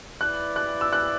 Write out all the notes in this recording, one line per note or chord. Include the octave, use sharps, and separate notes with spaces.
E4 B4 D5 F#6
F#6
E6
F#6